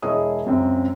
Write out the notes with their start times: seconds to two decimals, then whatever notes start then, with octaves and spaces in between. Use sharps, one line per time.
0.02 E1 E4 G#4 C#5 D#5 D#6
0.46 C#2 F#2 C4